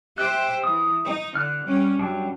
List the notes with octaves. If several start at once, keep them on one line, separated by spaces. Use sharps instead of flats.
G4 C5 E5 F#6
E3 D#6
D#4
D3 F6 F#6
G3 C#4
F#2 F#3 G3 D4